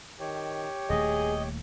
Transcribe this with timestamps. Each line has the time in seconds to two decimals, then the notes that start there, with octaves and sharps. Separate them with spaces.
0.20 D#3 G4 C#5
0.90 D#1 D#2 A3 G#4 D#5